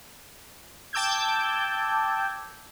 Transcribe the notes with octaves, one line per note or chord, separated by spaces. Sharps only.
G5 A5 D6 E6 G6 G#6